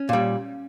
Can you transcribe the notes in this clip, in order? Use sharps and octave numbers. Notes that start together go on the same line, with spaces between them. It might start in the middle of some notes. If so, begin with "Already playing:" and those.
Already playing: C#4
A#2 G3